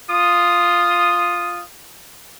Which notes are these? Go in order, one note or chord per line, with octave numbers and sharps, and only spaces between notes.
F4 D#6